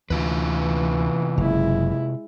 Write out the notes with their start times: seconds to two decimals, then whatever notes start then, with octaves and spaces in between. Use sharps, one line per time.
0.10 D2 C3 E3 F4 B4
1.37 F#1 G#3 E4